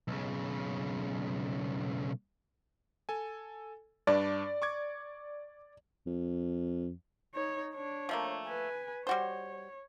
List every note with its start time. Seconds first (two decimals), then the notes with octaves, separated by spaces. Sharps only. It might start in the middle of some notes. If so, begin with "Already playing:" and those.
0.08 B1 C#3
3.09 A4 G#5
4.07 G2 D4 B4 D5
4.62 C#6 D6 G#6
6.07 F2
7.35 D#4 C#5
7.74 D4 C#5
8.09 F3 A3 A#3
8.45 B4 G#5
9.07 G3 F#4 C5 C#5